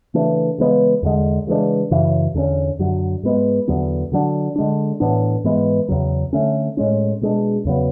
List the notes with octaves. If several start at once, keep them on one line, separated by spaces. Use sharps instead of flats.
C#3 E3 A3 D4
C#3 E3 G#3 B3
E2 D3 G#3
C#3 E3 G#3 D4
F#2 C#3 E3
E2 D3 A3 C#4
F#2 D3 F#3
G#2 G#3 B3
E2 D3 F#3 B3
D3 F#3 A3 D4
D3 G#3 D4
A2 E3 B3 D4
G#2 E3 G#3 B3
E2 C#3 F#3
D3 A3 C#4
A2 G#3 C#4
B2 G#3 D4
E2 C#3 F#3 B3